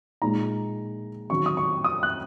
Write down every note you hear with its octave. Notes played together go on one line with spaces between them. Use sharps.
A#2 G#3 D#4 A#5
D#3 F#3 C#4 C#6
D#6
C#6
D#6
F#6